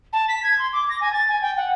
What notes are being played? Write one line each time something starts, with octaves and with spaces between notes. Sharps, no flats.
A5
B6
G#6
C6
D6
A#6
G#5
A6
G#5
G5
F#5